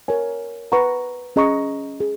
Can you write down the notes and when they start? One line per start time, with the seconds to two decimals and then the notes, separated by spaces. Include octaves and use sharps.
0.08 A#4 C#5 G#5
0.72 B4 F#5 A#5 C#6
1.36 C#4 G#4 D#5 A#5 C#6
2.00 G#4